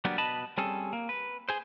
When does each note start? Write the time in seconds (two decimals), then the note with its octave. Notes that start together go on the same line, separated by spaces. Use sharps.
0.05 F#3 G3 A#3 B3 D4
0.18 B2 B4 D#5 A5 B5
0.58 G3 C4 C#4 G#4 A4
0.93 A#3
1.09 B4
1.49 G#4 C5